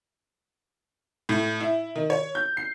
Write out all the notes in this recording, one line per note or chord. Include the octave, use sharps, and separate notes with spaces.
A2
E4
D#3
C#5
G6
C7